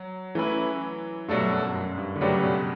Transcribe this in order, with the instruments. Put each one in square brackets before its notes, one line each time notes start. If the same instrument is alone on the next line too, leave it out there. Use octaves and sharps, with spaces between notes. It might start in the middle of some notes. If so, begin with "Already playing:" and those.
Already playing: [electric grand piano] F#3
[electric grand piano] E3 [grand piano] A3 C#4 E4 B4
[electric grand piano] G2 [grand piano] B2 F#3 A3 D4 A4
[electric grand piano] F#2
F#2
G2
D3
[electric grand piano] C#3 [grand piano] F#3 A3 D4 G4 B4
[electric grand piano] B2